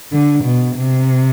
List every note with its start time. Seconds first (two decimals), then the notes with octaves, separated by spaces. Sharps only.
0.12 D3
0.44 B2
0.75 C3